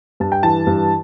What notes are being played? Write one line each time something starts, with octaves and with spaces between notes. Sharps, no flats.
G2 A5
G5
E3 A5
G2